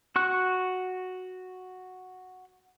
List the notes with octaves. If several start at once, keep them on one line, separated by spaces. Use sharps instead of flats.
F#4 C#6 F#6